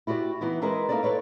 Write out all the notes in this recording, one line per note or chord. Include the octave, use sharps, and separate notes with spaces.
E4 F#4 G4 A#4 D5
E3 B3 D#4 E4
G#3 E4 G#4 A#4 B4 D#5
A#3 D#4 E4 A4 D5
A4 B4 C#5 D5